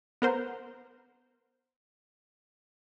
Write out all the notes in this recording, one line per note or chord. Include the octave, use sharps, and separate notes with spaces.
B3 A#4 C5